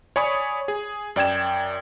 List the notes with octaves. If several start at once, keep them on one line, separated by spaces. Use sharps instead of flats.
C#5 D5 G#5 B5 C#6 D#6
G#4
F#2 D5 G5 G#6 E7